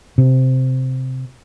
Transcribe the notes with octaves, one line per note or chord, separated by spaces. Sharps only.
C3